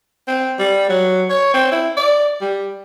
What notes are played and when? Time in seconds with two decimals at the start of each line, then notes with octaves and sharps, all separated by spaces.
0.28 C4
0.59 G3
0.89 F#3
1.30 C#5
1.54 C4
1.72 E4
1.97 D5
2.41 G3